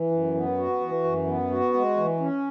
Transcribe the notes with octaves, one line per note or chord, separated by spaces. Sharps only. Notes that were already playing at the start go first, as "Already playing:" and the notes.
Already playing: E3
F#2
B3
F#4
E3
F#2
B3
F#4
G#3
E3
C#4